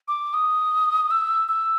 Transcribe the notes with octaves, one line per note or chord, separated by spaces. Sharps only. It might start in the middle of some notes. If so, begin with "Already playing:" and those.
D6
D#6
E6
E6